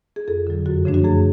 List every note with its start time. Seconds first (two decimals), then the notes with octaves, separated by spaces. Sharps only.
0.16 G#4
0.28 F2 A4
0.47 D3 F#3
0.66 F#2 F#4
0.85 C#3 F3 A3 D4
0.94 F#4
1.04 F#2 G#4